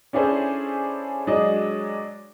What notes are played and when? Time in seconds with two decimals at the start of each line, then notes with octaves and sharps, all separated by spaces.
0.13 C#4 D4 E4 G#4 A4 C5
1.27 F#3 G#3 D4 D#5